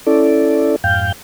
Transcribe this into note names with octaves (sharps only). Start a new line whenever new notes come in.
C#4 E4 A4 D5
F2 G#2 F5 G5 G6